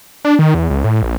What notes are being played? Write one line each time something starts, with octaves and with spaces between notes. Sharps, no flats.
D4
D#3
E2
C#2
A2
A#1